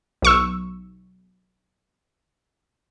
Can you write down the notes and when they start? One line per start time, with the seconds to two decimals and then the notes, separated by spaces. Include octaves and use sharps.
0.22 B1 C#6 E6